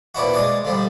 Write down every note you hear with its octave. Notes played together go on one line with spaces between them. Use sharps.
A#1 B2 D4 E4 F#4
G#3 G#4 D5
D3 F3 G3